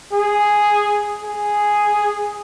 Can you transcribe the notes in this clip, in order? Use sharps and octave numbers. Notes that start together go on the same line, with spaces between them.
G#4
G#4